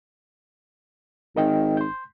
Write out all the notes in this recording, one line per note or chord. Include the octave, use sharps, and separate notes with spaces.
G#1 A#4 D#5 G5
C6 G6